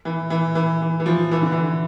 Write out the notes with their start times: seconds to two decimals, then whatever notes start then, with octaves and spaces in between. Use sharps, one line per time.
0.05 E3
0.30 E3
0.55 E3
0.81 E3
1.00 E3
1.06 F3
1.31 E3
1.42 D3
1.52 E3